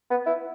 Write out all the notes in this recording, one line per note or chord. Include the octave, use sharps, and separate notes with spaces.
B3
E4